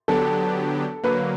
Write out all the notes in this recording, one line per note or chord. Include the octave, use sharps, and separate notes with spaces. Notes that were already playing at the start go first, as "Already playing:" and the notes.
D3 F#3 B3 D4 G4 A4
D3 F#3 A#3 B4